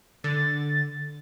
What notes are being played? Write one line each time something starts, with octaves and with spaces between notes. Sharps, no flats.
D3 A6